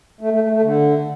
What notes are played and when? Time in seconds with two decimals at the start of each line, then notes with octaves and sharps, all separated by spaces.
0.21 A3
0.31 A3
0.41 A3
0.52 A3
0.62 D3